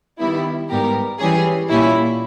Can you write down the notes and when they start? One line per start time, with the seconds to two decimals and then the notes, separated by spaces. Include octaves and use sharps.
0.19 D#3 G3 B3 E4
0.69 G#2 G3 B3 G4 A#4
1.19 E3 G3 C#4 G#4
1.69 A#2 G3 C#4 E4